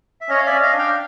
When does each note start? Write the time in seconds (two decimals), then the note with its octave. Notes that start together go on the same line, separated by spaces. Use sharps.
0.21 E5
0.29 C#4 C#5 D#5
0.38 F5
0.46 D5 E5
0.51 C#4
0.62 D#5 F5
0.73 D4
0.78 F5 G5